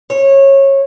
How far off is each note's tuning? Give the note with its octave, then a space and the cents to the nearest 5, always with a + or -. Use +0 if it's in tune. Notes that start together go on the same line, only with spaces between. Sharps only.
C#5 -20